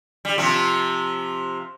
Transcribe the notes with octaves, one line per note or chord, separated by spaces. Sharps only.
G3
C3 F3